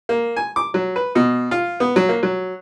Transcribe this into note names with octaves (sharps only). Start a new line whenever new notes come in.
A#3
G#5
D6
F#3
B4
B2
F4
B3
F#3
A#3
F#3